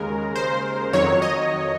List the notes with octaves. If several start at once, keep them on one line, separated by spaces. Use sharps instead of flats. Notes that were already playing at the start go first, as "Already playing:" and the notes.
Already playing: D#2 C#3 G#3 A#4
C5
F2 D#3 F#3 C#5
D#5